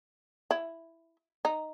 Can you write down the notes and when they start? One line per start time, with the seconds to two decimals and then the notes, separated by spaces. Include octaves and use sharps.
0.51 E4
1.45 D#4